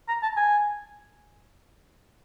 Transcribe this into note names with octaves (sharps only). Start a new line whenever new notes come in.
A#5
A5
G#5